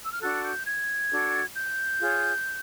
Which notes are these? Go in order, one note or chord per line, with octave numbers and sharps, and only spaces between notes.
E6
F6
D4 F#4 A4 F#6
G6
G#6
D4 F#4 A4
G6
F4 G#4 C#5